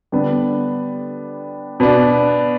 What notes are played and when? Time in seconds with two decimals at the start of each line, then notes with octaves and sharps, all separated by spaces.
0.12 D3 G3 B3 D4
1.80 B2 B3 D4